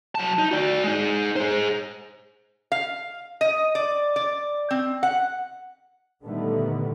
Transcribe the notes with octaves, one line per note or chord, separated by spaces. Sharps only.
F#3 A5
D#4
F#4 D5
G#3 D#4
G#4 C5
F5
D#5
D5
D5
C4
F#5
A#2 D3 D#3 G3 A3 B3